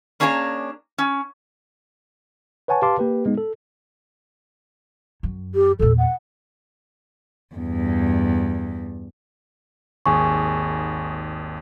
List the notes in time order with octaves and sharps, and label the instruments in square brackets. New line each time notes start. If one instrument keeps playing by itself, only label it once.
[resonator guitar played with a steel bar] A#3 C#4 D4 G#4 C#5 A#5
C#4
[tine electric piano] B4 C#5 F#5 G#5 A5 C#6
G4 B4 F5 A5 C6 D6
A#3 G4 B4
G#3 B3 D#4
A4
[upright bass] F#2
[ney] G4
[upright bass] E2 A#2 [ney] A4
[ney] F#5
[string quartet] E2 G2
[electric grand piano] G#1 D#2 G#4 [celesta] G#5 C#6